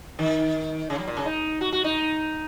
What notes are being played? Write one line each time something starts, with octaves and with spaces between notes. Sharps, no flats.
D#3
C#3
F#3
A#2
C#3
D#4
F#4
F#4
D#4